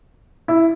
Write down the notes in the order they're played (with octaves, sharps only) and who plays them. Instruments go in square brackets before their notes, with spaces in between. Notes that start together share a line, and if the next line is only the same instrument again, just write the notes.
[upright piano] E4